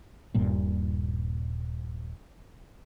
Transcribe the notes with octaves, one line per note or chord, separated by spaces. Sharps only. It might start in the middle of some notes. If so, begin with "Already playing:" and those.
D#1 G2 A#2